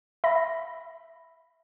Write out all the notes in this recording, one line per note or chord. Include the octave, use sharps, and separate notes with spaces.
E5 B5 A#6